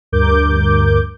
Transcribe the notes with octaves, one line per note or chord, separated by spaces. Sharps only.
D2 G2 A#4 D6 G6